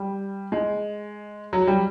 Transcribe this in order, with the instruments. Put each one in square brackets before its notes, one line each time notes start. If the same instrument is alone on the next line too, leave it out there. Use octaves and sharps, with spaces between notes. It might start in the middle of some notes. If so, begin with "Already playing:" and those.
Already playing: [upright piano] G3
G#3
F#3
G3